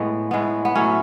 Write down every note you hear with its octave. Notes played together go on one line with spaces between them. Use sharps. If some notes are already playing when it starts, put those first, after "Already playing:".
Already playing: A2 G#3 B3
A2 G#3 B3
B3
A2 F#3 A3 C#4